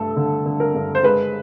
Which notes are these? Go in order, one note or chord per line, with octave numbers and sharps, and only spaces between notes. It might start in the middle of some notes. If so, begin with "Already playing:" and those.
Already playing: G2 A3 A4
D3
D3
A#4
G2
C5
G#3 B4